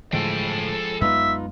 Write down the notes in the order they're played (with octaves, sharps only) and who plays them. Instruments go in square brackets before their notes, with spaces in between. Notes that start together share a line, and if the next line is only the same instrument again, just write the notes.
[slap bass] A2 D3 E3 [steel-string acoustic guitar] F3 G#3 [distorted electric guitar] A4 G5
[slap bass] F#2 G#3 B3 [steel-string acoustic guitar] D#4 F4 B4 [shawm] E5